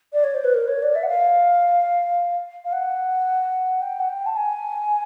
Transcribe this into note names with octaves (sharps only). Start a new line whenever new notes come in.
D5
C#5
C5
B4
A#4
C#5
D5
E5
F#5
F5
F5
F#5
G5
F#5
G5
A5
G#5